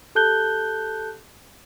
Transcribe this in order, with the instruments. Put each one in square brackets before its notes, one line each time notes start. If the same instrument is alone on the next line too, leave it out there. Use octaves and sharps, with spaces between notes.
[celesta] G4 A4 A5 F#6 G6 G7